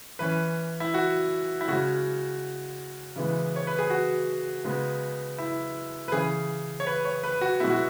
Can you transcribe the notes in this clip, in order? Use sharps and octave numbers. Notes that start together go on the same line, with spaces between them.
E3 C#4 B4
E4
F#4
E4
C#3 G#3 C#4 F#4
C#3 E3 G#3 B3
C#5
B4
G#4
F#4
C#3 G#3 B3
E4
B4
C#3 E3 C#4 G#4
C#5
B4
C#5
B4
F#4
B2 G#3 B3 E4
F#4